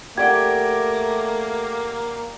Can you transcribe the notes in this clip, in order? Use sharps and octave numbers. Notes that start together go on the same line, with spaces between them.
A3 A#3 G4 D5 F#5 G5 G#6